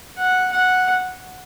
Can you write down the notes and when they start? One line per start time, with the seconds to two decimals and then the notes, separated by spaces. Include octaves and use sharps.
0.17 F#5
0.52 F#5